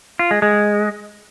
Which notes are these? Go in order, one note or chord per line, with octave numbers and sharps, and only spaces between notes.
F4
G#3
G#3